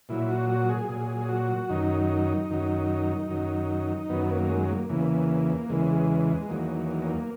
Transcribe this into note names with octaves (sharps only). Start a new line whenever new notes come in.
A#2 F#3 E4
F#4
F#4
G#4
A#2 F#3 G#4
F#4
F#2 D#3 F#3 D#4
F#2 D#3 F#3
F#2 D#3 F#3
F#2 D#3 F#3 B3
A#3
G#3
A#3
E2 C#3 E3 A#3
E2 C#3 E3 G#3
E2 D#3 F#3 A#3
A#3
A#3